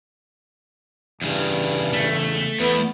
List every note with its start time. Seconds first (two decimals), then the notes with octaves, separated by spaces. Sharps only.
1.21 E2 G2 C#3
1.93 A3
2.60 E2 B3